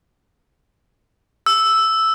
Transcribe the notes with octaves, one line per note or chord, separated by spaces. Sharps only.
E6